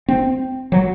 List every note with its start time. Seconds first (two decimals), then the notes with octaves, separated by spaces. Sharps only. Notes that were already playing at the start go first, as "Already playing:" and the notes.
0.08 C4
0.72 F#3